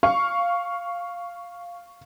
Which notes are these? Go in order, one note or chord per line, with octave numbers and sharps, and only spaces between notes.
F5 C#6